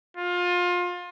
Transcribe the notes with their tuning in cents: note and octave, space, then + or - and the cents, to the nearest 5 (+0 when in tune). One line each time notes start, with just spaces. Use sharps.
F4 +25